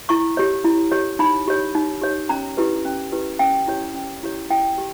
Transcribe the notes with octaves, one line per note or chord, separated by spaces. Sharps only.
E4 C#6
G4 C#5
E4
G4 C#5
D#4 B5
G4 C#5
D#4
G4 C#5
C#4 A#5
E4 G4 B4
C#4
E4 G4 B4
C#4 G5
E4 G4 C#5
C#4
E4 G4 C#5
E4 G5
G4